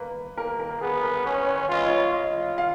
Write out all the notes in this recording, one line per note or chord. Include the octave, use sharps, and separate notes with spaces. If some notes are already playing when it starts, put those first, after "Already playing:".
Already playing: A#3 B4
A#3 A#4
A#4
B3 G#4
A#4
C#4 B4
C#5
B4
F4 D#5
C#5
F4 D#5
F5